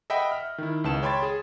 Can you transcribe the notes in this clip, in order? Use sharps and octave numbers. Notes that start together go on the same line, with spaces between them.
D#5 E5 F#5 G5 B5
F6
D#3 E4
C#2 B4 A5 E7
C#5 G5 B5 C6 G#6 A6
G#4